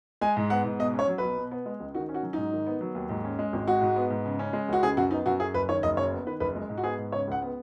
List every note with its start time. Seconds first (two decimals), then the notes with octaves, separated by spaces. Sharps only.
0.21 G#3 G#5
0.37 G#2
0.50 B3 F#5
0.65 G#2
0.79 B2 D#5
0.94 C#4
0.99 C#5
1.08 F#3
1.18 B1 B4
1.37 B2
1.51 B3
1.66 G#3
1.80 C#2
1.94 D#3 F#4
2.09 C#4
2.14 F#4
2.23 F#3
2.33 G#2 D#4
2.52 D#3
2.67 B3
2.81 F#3
2.95 D#2
3.09 G#2
3.24 C#4
3.39 G#3
3.53 G#1
3.67 G#3 F#4
3.81 G#2
3.96 B3
4.10 G#2
4.25 C#3
4.39 C#4
4.53 G#3
4.68 C#2 F#4
4.83 C#3 G#4
4.97 F#2 F#4
5.11 B3 D#4
5.26 F#2 F#4
5.40 F#2 G#4
5.54 F#1 B4
5.69 D#3 C#5
5.83 F#1 D#5
5.97 F#2 C#5
6.12 B3
6.26 D#3 B4
6.40 F#1 B4
6.56 G#3
6.70 G#2
6.78 F#4
6.84 B3 G#4
6.98 G#2
7.12 C#3 C#5
7.27 C#2 F#5
7.42 B3